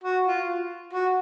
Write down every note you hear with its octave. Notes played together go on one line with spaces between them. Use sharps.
F#4
F4
F#4